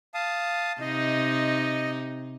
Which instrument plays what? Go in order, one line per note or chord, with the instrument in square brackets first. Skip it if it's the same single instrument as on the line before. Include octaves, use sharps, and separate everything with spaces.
[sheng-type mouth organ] F5 A5 D#6
[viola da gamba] C3 D#4 [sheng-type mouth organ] D#5